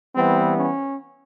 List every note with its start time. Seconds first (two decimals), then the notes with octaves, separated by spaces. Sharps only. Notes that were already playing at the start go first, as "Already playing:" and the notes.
0.16 E3 G3 B3 C4
0.56 C#4